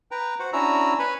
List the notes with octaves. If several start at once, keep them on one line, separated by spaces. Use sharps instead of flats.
B4 G5 A#5
F#4 C5 F#5
C#4 D4 E4 F#4 A#5 E6
B4 C#5 G#5 B5